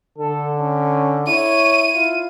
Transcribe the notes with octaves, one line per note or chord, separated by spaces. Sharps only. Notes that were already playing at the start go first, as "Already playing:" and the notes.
D3 A4
C#4
E4 C#5 D#7
E4 F4